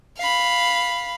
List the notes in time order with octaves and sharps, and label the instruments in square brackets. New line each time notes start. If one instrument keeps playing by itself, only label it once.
[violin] F5 B5